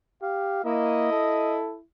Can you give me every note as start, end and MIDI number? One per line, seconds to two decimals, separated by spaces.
0.23 0.62 67
0.23 0.64 77
0.64 1.09 58
0.64 1.82 64
0.64 1.58 75
1.12 1.77 69